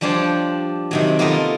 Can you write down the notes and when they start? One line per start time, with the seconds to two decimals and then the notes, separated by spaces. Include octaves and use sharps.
0.01 F3 G3 D4 G4 C5 C#5
0.91 C3 D#3 F#3
1.19 A#3 B3 D#4 F4 A4 A#4